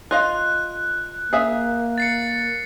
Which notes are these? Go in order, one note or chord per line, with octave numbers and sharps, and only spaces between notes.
F4 D#5 F5 F#6
A#3 G#4 E5 F5
A6 C7 C#7